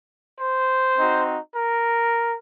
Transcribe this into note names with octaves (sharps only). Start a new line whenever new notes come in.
C5
C4 D#4 F#4
A#4